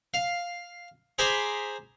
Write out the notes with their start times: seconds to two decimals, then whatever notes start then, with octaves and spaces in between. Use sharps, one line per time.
0.14 F5
1.18 G#4 C5 G#5 A#5 B5 D6